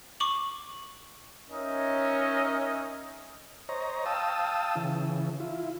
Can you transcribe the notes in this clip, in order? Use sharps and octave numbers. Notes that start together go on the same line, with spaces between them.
C#6 D6 F#7
C#4 D#4 A#4 C#5 D#5 E5
C5 C#5 D#5 A#5
F5 G5 A5 D#6 E6
C#3 E3
E4 F4